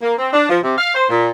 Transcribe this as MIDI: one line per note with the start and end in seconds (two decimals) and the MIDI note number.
0.02 0.13 58
0.18 0.29 60
0.33 0.49 62
0.49 0.58 53
0.63 0.77 48
0.78 0.92 77
0.94 1.08 72
1.09 1.30 46